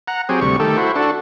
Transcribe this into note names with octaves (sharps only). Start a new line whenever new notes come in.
F#5 A#5
F#3 C4 G4 G#4
D2 C3 G3 C#6
D#3 A3 G4 A4
E4 F#4 C5
D4 F#4 A4